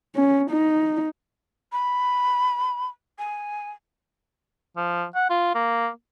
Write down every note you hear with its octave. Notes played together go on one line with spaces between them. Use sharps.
C#4
D#4
B5
G#5
F3
F#5
F4
A#3